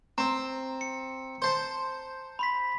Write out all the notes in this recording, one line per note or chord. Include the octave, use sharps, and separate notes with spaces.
C4 A#5
C#7
C5 A5
B5 C6 B6